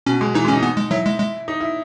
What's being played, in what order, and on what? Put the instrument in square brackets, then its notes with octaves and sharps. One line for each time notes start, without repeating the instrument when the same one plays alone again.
[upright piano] B2 [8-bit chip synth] C#4
[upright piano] G#3
[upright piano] E3 [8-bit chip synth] D#4
[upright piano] G#3
[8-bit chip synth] C#4 [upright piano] D#4
[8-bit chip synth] B3
G#3
[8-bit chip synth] F#3 [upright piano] E4
[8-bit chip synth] G#3
G#3
[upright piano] D#4
E4